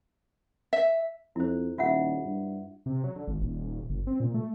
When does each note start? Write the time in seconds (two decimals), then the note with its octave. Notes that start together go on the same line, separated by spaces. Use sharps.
0.73 E5
1.36 F2 E4 C5
1.78 D#1 F4 E5 F#5
2.24 G2
2.86 C3
3.04 F#3
3.16 D3
3.27 G#1
3.41 D#1
3.90 G1
4.07 C4
4.20 A#2
4.34 A3